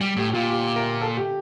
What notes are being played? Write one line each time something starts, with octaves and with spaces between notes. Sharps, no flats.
G3 G4
A2 G4
G4
A#2 F4
G4
A#4
A4
G4